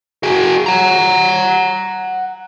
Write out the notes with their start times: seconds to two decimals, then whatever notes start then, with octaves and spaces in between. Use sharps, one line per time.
0.23 F#4 G#4
0.66 F#5 A#5